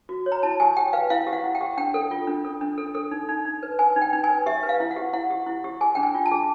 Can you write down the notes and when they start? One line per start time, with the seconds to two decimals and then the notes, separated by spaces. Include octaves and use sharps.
0.09 F#4
0.26 C#5
0.32 A#5
0.43 E4 A5
0.60 G4 G#5
0.76 G4 G5
0.93 B4 F5
1.10 E4 F5
1.27 G4
1.33 F#5
1.44 E4
1.55 G5
1.61 G4
1.77 D4 G5
1.94 A4
2.11 F4
2.27 D4
2.45 A4
2.61 D4
2.78 A4
2.95 A4
3.11 D#4
3.29 D#4
3.45 D#4
3.63 B4
3.79 B4 G#5
3.96 D#4
4.02 G5
4.13 D#4
4.24 G#5
4.29 B4
4.46 G4 E5
4.63 B4
4.69 F5
4.80 E4
4.91 F#5
4.96 G4
5.13 E4 F#5
5.30 G4
5.46 E4
5.64 G4
5.81 G#4 G#5
5.95 D4 G5
6.03 G#5
6.14 F4
6.26 A5
6.31 G#4